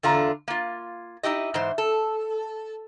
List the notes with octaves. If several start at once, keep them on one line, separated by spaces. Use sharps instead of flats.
E2 D3 F4 A#5
A#3 F4
D#4 E4 G4 D#5
G#2 E3 C5
A4